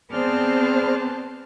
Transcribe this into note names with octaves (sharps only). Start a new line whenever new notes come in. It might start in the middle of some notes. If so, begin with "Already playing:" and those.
B3 C4 G#4 C5 D5 A5 F6